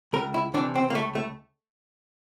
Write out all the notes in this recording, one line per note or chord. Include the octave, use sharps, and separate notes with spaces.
C#2 A#4
E4
C3 E3 D4
C4
A#3
C#2 A3
A3